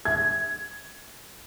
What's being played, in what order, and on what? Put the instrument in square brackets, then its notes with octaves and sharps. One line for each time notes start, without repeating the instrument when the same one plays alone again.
[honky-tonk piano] G#6